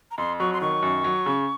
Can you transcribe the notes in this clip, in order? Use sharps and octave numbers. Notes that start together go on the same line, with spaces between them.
A#5
F2 C6
F#3 C#6
C6
D#3 C#6
F#2
F#3
C#3